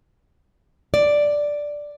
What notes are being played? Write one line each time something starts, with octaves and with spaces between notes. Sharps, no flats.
D5